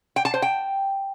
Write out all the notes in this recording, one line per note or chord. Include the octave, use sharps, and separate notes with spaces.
G5
A5
C5
G5